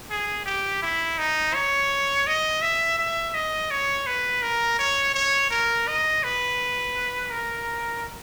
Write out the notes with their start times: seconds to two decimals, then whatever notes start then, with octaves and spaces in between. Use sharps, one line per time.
0.11 G#4
0.46 G4
0.82 E4
1.19 D#4
1.54 C#5
2.27 D#5
2.62 E5
2.99 E5
3.34 D#5
3.71 C#5
4.07 B4
4.42 A#4
4.79 C#5
5.14 C#5
5.50 A#4
5.88 D#5
6.24 B4
7.31 A#4